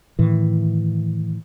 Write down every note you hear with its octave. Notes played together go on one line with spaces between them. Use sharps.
A2 D#3 E3